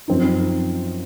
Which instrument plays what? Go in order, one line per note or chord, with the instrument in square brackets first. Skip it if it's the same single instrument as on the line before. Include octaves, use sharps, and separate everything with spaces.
[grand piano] F#2 F3 C4 D#4